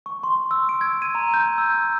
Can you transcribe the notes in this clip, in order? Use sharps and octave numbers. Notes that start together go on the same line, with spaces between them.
C#6
C6
E6
D7
G#6
D#7
A#5
G6
E6
E6